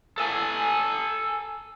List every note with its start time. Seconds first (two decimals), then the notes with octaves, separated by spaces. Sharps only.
0.18 A4 G#5